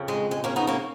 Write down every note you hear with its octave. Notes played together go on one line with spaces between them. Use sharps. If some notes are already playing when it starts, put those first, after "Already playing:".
Already playing: F2 C#3
G#3
G#3
A#3 C#4
B3 D#4
A#3 C#4